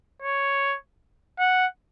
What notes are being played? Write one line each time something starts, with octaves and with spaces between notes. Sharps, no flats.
C#5
F#5